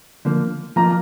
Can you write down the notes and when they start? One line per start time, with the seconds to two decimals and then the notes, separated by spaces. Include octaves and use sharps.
0.25 D3 F3 A#3
0.76 F3 A#3 F4 A#5